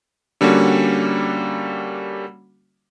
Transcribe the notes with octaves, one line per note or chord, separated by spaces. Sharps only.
D3 G3 A#3 C#4 F#4